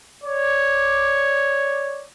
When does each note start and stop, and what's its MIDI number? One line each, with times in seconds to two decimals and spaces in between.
0.24 2.03 73
0.24 2.03 74